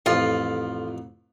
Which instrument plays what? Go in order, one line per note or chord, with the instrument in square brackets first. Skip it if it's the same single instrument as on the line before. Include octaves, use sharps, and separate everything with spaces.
[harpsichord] A1 F2 [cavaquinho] F4